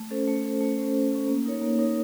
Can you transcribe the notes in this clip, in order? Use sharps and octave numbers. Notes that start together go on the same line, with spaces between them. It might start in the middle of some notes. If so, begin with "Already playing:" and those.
Already playing: A3
C#4 A4 C5
A3
C#4 A4 C5
A3
C#4 A4 C5
A3
C#4 A4 C5
A#3
D#4 A#4 C#5
A#3
D#4 A#4 C#5